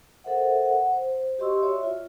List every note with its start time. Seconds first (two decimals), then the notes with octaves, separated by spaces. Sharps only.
0.24 A4 A#4 C5 E5 F#5
0.65 F#5
0.93 C5
1.39 F#4 G4 D#5 C6 C#6 E6
1.62 F#4 C#5 D5 E5
1.83 F4